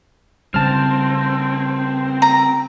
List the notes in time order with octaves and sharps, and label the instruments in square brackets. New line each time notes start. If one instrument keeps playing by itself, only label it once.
[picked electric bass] C#3 G3 [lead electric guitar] C4 [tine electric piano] A5 F6
[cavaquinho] A#5